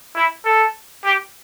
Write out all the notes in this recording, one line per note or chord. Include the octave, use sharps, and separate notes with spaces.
E4
A4
G4